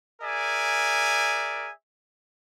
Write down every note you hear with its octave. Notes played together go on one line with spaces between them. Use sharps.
G#4 A#4 D5 E5 G#5